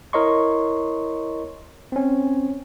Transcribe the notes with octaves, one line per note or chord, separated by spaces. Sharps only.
E4 A#4 C#5 D#5 C6 C#6
C4 C#4